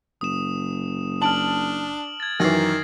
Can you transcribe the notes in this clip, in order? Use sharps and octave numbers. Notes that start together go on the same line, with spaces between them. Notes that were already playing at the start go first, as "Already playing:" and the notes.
F#1 D#6 E7
D4 A5 F6 D7 F#7
G#6 A6
F#2 D#3 E3 A#6 C7